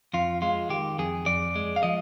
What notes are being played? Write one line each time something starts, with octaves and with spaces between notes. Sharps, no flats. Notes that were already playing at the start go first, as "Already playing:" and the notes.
F2 F4
G#3 F4
D#3 G4
F2 G#4
F2 D5
G#3
F5
F3 D#5